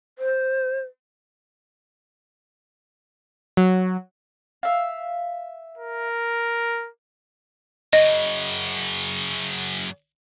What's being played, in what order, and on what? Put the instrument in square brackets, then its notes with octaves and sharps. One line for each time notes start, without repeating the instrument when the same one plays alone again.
[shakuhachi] C5
[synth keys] F#3
[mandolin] E5 F5
[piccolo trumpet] A#4
[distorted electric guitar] F#2 C#3 [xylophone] D#5